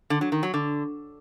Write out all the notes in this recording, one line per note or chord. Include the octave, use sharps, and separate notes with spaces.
D3
F#3
D#3
F#3
D3